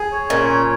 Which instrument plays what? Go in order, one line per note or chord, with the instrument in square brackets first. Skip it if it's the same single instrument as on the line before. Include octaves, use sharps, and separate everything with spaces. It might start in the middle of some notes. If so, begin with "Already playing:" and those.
Already playing: [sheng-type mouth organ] G#4
C#5
[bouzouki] A#2 [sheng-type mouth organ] C#4
[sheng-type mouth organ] C#5